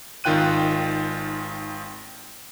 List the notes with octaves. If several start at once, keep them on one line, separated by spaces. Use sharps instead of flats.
G#1 D#3 F4 G5 F#6 D#7